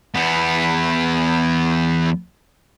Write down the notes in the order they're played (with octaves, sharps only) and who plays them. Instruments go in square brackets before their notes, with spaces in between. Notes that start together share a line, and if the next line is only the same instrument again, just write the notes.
[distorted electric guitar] E2 B3